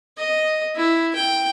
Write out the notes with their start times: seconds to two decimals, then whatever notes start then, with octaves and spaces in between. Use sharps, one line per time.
0.18 D#5
0.76 E4
1.16 G5